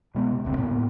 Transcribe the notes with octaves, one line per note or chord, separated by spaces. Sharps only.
B2 G#3 B3
C3
E1 D2 C4
A2 A#3 B3